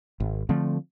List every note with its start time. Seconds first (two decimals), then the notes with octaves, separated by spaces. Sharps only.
0.20 G#1
0.49 D3 F3 A3 C4